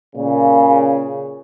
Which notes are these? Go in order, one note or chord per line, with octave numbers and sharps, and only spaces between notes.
A#2 C#3